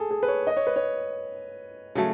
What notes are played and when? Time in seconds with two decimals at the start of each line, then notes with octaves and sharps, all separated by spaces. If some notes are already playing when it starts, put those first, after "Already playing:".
Already playing: G#4 A4
0.11 G#4
0.23 B4
0.28 C#5
0.47 D#5
0.57 C#5
0.67 B4
0.76 C#5
1.95 C#3 F#3 A3